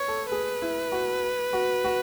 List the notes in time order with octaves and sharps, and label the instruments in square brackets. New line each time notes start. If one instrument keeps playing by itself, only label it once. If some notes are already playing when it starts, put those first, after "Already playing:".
Already playing: [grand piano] B4 [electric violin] C#5
[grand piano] A4
[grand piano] G#4 [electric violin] B4
[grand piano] E4
F#4
F#4
F#4